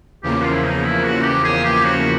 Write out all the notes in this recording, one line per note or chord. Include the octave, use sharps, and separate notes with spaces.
E2 C#3 F3 A#3 G4
F4
E4
D#4
E4
F#4
G4
G#4
G4
F#4